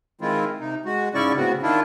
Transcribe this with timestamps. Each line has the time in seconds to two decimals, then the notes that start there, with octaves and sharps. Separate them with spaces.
0.21 D#3 E3 G#3 C4 E4 F4
0.60 C3 D#4
0.85 G#3 F#4
1.14 G#2 C#3 C#4 E4 D5 C#6
1.37 A2 C#3 B3 C4 F#4
1.62 D#3 D4 E4 F4